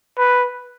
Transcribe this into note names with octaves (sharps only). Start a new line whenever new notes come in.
B4